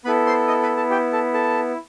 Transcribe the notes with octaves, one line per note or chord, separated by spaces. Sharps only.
B3 E4 A4 B4 B5
C5 C6
D#5 D#6
B4 B5
A4 A5
G4 G5
A4 A5
A4 A5